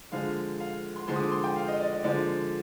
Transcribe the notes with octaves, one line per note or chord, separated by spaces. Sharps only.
D3 F3 G#3 F5
F5
C6
D3 F3 G#3 C6
D#6
D6
C6
G5
F5
D#5
D5
D5
D3 F3 G#3 D5